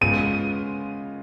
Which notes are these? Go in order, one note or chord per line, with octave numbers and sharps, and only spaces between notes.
C#3 G#3 B3 F4 D#7